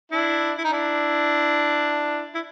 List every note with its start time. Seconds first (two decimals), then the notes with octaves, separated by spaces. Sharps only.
0.11 D4 E4
0.58 E4
0.64 D#4
0.72 D4 E4
2.34 E4